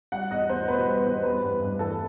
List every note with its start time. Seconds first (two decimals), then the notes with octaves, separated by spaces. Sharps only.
0.12 G3 F#5
0.31 E2 D#5
0.49 E2 C5
0.68 B2 B4
0.86 G3
1.05 E2
1.23 G3 B4
1.42 G2
1.61 G2
1.79 E3 A4